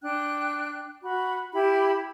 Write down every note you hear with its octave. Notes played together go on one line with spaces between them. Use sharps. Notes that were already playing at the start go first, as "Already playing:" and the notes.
D4 G5 F#6
F#4 B5
E4 G4 B5